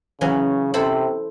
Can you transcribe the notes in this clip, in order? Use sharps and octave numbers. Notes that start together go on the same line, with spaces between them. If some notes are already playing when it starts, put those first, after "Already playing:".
C#3 E3 F#3 C#4
C3 E4 A4 C5